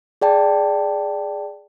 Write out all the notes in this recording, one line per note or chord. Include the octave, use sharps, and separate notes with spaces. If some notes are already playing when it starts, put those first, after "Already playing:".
G#4 D5 G5 A5